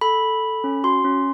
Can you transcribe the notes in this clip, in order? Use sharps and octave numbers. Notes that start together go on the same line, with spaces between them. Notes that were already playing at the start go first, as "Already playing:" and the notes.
A4 B5
A4
A4
C#4
F#4 C6
C#4